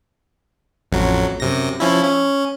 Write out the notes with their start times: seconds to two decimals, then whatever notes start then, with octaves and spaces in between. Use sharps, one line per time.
0.92 A1 F2 F#3
1.40 F#2 C3 A#6
1.80 F3 C#4 E4
2.04 C#4